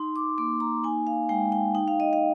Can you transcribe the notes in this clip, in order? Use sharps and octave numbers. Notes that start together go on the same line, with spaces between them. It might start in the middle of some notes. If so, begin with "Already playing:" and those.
Already playing: D#4 C6
D6
A#3 D6
A#5
D#4 G#5
F5
G#3 G5
G5
D#4 G5
F5
D#5
F5